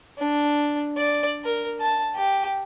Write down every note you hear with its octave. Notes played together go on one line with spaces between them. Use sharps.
D4
D5
A#4
A5
G4